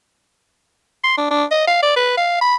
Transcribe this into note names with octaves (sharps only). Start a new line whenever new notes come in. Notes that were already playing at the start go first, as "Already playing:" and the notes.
C6
D4
D4
D#5
F5
D5
B4
F5
B5